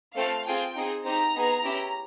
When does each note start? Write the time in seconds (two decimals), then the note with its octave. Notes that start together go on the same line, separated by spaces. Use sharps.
0.16 A3 C4 F4 A4 F5
0.46 C4 F4 G#4 G5
0.76 C4 D#4 G#4
1.05 C4 D#4 G4 A#5
1.35 B3 D#4 G#4
1.64 C#4 E4 G4